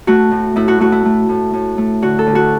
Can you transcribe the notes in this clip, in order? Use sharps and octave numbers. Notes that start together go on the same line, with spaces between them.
A3 F#4
A2
A2 E4
F#4
A3 F#4
E4
A3
A2
A2
A3
D3 F#4
A4
D2
F#4